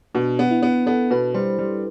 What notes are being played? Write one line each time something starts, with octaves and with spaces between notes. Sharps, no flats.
B2 D4
B3
E4
B3
B3 A4
B2 B4
G3 C5
G3